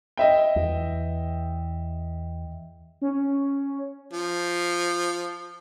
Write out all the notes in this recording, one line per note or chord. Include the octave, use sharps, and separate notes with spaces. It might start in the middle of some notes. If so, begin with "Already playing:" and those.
D#5 E5 G5
E2
C#4
F3